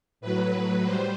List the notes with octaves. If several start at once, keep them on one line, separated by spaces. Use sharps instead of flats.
A2 F#3 B4
G3 C5